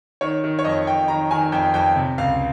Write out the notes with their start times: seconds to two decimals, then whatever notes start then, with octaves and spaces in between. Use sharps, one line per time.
0.21 D#3 C#5
0.44 D#3
0.59 C#5
0.64 F2 D#5
0.87 F2 G5
1.08 D#3 A#5
1.31 D#3 G#5
1.52 F2 G5
1.74 F2 G5
1.96 C3
2.18 C#2 F5